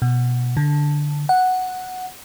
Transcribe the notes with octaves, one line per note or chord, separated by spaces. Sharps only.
B2
D3
F#5